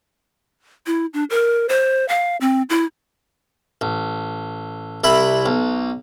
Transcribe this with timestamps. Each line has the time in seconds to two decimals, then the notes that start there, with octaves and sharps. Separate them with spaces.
0.86 E4
1.14 D4
1.30 A#4
1.69 C5
2.08 F5
2.41 C4
2.70 E4
3.81 A1
5.04 C2 E4 B5
5.46 B1